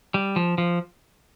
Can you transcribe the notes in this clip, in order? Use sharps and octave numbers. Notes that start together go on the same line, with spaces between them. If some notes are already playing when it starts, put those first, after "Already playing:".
G3
F3
F3